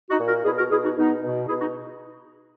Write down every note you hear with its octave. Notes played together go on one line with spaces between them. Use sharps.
D#4 F#4
A#2
F#4 A#4
B2 E4 G#4
F#4 A#4
B2 E4 G#4
D#4 F#4
B2 B3 D#4
B2
B2 E4 G#4
D#4 F#4